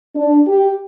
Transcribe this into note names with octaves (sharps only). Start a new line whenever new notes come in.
D4
G4